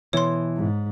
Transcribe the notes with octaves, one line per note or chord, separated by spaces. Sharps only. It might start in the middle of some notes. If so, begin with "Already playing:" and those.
B2 E3 C#5 C6
G#2